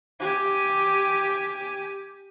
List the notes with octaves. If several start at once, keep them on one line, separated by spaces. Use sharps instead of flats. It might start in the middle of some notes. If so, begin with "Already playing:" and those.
G4 G#5